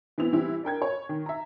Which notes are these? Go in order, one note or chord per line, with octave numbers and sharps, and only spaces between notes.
E3 B3 C4 E4 F7
E3 G3 C4 E4
D4 A#4 G5 G#6
C#5
D#3
E5 A#5